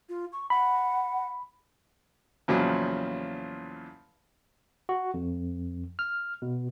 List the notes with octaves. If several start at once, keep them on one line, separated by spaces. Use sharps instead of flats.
F4
C#6
F#5 B5
E2 A#2 C#3 F3 F#3
F#4
F2
F6
B2